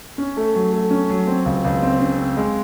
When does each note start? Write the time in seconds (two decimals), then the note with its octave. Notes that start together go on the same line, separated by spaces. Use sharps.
0.18 C#4
0.37 A3
0.55 F#3
0.73 A3
0.91 C#4
1.10 F#3
1.27 C4
1.46 C#2
1.64 C#2
1.82 C4
2.00 C#3
2.18 C4
2.37 G#3